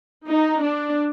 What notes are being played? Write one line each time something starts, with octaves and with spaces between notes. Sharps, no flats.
D#4
D4